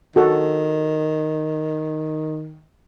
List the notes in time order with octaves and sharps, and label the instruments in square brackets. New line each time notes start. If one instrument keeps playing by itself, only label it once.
[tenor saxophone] D#3 [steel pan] F#4 A4